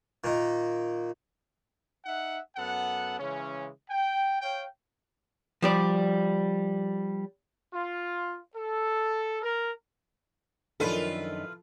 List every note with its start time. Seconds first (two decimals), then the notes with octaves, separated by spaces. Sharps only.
0.24 A#2 D#3
2.05 D#4 E5 F#5
2.56 F#2 B3 A4 F#5
3.20 C#3 E3 G#3 C#4
3.90 G5
4.41 C#5 F5 G5
5.62 F3 G3 D5
7.73 F4
8.55 A4
9.42 A#4
10.80 F#2 D#3 F3 D4 E4 F4 A4 B4